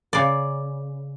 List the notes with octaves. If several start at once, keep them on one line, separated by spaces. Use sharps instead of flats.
C#3 D5